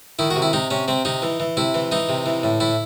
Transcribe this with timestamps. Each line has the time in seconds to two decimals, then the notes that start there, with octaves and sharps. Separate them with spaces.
0.19 D#3 E4
0.31 F#4
0.36 C3
0.42 E4
0.53 C3 D#4
0.71 C3 C#4
0.88 C3 C4
1.05 C3 D#4
1.22 E3
1.40 E3
1.57 C3 E4
1.74 E3
1.91 E3 D#4
2.09 C3
2.26 E3
2.43 A2
2.60 A2 E4